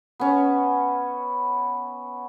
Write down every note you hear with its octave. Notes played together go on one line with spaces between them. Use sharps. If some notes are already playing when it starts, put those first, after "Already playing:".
B3 C#4